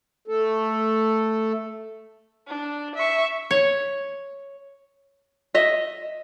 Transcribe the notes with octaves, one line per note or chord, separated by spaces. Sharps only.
A3 A4
D4
E5 C#6
C#5
D#5 E5